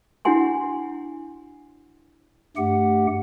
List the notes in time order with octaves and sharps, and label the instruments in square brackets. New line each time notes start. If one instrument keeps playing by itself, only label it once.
[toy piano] D4 E4 F#4 F#5 G#5 C6
[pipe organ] G2 A3 G4 F#5